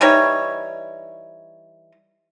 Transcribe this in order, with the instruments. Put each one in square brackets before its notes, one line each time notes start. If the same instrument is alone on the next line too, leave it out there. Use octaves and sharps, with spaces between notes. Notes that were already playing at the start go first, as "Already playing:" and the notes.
[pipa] E3 G3 D#4 C#5